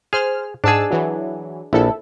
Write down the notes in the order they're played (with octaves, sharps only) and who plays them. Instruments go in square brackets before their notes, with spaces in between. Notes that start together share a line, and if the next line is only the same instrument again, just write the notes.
[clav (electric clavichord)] G#4 [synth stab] C5 F6
[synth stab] G#2 A5 E6 [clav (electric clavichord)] D4 G#4
[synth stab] E3 F#3
[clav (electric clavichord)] A#1 [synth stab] E4 A4